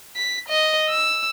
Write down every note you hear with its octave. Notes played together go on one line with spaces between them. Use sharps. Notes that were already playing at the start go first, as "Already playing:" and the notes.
B6
D#5
E6